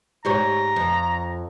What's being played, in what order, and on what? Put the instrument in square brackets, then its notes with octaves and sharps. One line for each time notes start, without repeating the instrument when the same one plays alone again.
[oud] G#2 G4 C#5 [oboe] A#5
[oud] F2